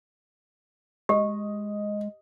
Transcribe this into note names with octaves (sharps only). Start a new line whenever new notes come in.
G#3 G4 D#5